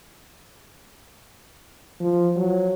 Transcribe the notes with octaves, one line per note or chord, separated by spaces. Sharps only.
F3
F#3